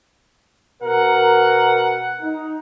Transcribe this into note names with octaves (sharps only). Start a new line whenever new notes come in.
B2 A#4 F#5
D#4